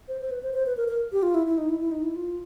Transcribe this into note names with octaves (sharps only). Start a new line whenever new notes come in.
C5
C5
B4
C5
C5
B4
A#4
A#4
G4
F4
E4
E4
D#4
E4
E4
D#4
E4
F4